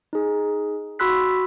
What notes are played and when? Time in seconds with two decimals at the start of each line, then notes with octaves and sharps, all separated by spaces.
0.13 D#4 G#4
0.99 F#4 B5 C6 E6 F#6 B6